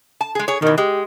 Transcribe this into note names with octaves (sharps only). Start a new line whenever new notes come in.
A5
G#3 G#4
G#4 C#5
B2 D#3 E3
G#3 G4